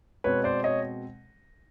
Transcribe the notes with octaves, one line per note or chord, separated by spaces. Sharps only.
B2 G#3 C4 B4 C#5
C5 D5
C#5 D#5